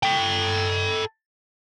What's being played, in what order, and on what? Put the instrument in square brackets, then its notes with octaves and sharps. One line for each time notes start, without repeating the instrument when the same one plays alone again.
[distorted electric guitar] A4 G5